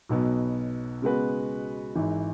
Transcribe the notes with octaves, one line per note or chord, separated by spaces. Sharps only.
B1 B2 F#3 B3
C#3 G#3 B3 F#4 B4
G#1 G#2 E3